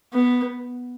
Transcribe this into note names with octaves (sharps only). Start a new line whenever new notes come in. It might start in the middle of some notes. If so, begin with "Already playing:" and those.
B3